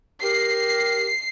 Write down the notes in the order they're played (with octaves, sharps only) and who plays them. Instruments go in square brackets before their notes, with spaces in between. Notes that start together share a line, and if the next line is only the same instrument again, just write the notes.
[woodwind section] G4 A#4 [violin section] C7